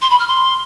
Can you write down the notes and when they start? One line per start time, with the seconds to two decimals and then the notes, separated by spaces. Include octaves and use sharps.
0.01 C6
0.10 B5
0.19 F6
0.27 C6